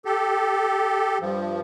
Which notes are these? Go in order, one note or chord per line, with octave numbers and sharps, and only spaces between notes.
G4 A4
G2 F3